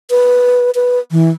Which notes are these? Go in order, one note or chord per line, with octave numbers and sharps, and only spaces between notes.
B4
B4
E3